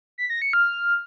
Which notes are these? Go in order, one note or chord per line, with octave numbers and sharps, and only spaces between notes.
B6
A#6
C#7
F6